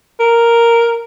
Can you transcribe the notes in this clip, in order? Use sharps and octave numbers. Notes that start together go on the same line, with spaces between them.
A#4